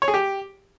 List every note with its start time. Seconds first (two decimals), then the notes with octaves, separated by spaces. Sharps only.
0.02 C#5
0.08 G#4
0.14 G4